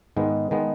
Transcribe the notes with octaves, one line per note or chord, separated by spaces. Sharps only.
G#2 D#3 G#3 B3
D#3 G#3 B3